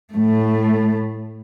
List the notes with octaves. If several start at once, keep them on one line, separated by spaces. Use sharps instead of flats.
A2 A3